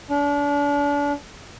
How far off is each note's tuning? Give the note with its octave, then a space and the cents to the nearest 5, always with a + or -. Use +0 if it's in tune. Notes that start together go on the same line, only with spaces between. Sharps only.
D4 -35